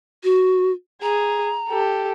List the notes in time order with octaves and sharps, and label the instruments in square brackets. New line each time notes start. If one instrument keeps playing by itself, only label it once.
[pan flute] F#4
[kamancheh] G#4 [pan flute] A#5
[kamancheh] G4 A4